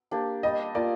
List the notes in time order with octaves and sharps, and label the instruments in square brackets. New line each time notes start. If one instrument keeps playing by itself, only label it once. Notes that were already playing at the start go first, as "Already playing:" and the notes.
[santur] A#3 D4 G4
[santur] G3 [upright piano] D#5
[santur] A#3 F4 [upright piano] D5